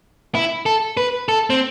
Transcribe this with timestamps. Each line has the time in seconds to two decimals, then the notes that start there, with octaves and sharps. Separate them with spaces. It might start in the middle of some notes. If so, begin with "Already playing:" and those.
0.35 E4
0.66 A4
0.97 B4
1.29 A4
1.50 C4